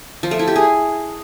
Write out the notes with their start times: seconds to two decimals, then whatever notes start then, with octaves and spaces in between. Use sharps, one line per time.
0.23 F3
0.31 A3
0.39 E4
0.47 G4
0.56 G#4